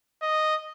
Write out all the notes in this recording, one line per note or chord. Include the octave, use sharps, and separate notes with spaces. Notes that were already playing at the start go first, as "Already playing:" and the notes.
D#5